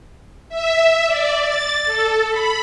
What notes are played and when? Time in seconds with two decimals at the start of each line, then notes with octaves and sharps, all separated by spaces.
0.49 E5
1.06 D5
1.43 A6
1.85 A4
2.29 B5